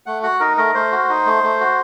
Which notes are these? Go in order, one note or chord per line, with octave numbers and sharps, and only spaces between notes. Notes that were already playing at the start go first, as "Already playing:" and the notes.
A3 F#5
F#4 F#5
D#4 A#4
A3 A#4
A3 C5
F#4
D#4
A3
A3
F#4